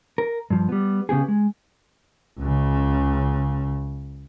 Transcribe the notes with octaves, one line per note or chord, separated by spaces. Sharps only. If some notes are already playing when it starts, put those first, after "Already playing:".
A#4
G2 F3
G3 B3
C#3 B3 G4 G#4
G#3
C#2 C#3